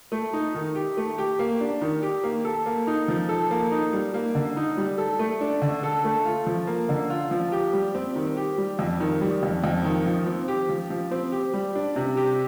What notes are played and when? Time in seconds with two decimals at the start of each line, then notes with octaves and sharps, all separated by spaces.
0.12 A3
0.33 D#4
0.55 D#3
0.76 G4
0.97 A3
1.18 G4
1.39 A#3
1.61 D4
1.82 D#3
2.03 G4
2.24 A#3
2.45 A4
2.66 A#3
2.87 D#4
3.08 F3
3.29 A4
3.51 A#3
3.72 D#4
3.93 G3
4.14 A#3
4.35 D3
4.57 D#4
4.77 G3
4.98 A4
5.19 A3
5.41 D4
5.62 D3
5.83 A4
6.04 A3
6.25 F4
6.47 F3
6.67 A#3
6.89 D3
7.10 F4
7.31 F3
7.52 G4
7.73 G3
7.95 C4
8.16 D#3
8.37 G4
8.58 G3
8.79 F2
9.00 D#3
9.21 G3
9.43 F2
9.64 F2
9.85 D#3
10.06 F3
10.26 C4
10.48 G4
10.69 F3
10.90 F3
11.11 C4
11.32 G4
11.53 G3
11.75 D4
11.96 C3
12.17 G4